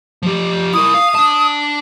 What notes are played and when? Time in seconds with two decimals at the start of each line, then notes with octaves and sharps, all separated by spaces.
0.23 F3 G4
0.74 E4 A#4 D#6
0.94 F5
1.15 D4 A5